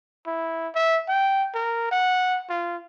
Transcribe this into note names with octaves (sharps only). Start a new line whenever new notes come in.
E4
E5
G5
A#4
F#5
F4